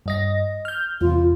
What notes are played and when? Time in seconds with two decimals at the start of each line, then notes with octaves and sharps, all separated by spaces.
0.06 G2 D#5 A#6
0.65 F6 G6
1.01 E2 C3 F4